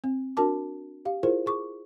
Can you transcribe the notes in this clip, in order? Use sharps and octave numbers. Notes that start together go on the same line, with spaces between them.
C4
D4 F#4 A#4 A5 D6
G4 F5
E4 F4 G#4 A#4 C5
G#4 C#6 D6